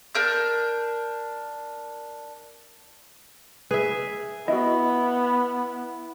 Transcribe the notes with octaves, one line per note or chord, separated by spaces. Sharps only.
D4 A#4 G6
G#4 B4 E5
B3 E4 F#4 D#5